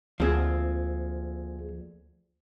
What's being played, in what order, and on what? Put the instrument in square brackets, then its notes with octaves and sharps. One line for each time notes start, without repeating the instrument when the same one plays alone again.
[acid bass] D2 [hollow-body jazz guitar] F3 C4 [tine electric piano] A#3 G#4 G#6